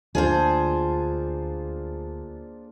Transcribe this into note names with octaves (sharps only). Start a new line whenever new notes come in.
D2 A#3 D4 F4 G#4 C5